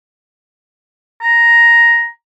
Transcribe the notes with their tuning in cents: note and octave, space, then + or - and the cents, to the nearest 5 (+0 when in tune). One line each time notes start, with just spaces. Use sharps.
A#5 +5